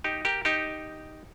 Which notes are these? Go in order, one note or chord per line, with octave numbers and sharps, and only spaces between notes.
D#4 G4
G4 A#4
D#4 G4